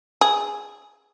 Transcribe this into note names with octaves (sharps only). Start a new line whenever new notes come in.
G#4